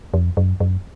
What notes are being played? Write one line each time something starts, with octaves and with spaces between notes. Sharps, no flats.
F2
F#2
F#2